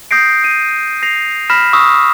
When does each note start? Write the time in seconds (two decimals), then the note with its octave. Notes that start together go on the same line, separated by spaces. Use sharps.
0.11 D#6 G6 A#6 C7 D7
0.44 D#7
1.02 A#6 C7 F7
1.50 B5 F6 A#6 B6 E7
1.73 C#6 D#6 E6